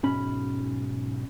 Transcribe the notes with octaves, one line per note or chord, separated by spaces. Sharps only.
B1 G#2 C#4 B5